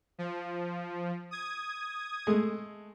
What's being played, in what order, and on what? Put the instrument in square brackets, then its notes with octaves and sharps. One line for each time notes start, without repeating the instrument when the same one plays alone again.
[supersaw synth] F3
D#6 G#6
[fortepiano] G#3 A3